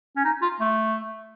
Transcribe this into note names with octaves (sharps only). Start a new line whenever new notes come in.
C#4
D#4
F4
A3